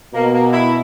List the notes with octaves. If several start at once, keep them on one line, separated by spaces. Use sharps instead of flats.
B2 A#3
A#3
E4